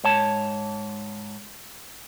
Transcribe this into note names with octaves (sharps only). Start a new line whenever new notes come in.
G#2 C#5 A5